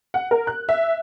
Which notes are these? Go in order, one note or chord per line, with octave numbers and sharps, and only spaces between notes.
F#5
A#4
F#6
E5